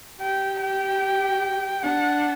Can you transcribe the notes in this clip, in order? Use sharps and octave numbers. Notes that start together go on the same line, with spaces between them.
G4 G5
G5
D4 F#5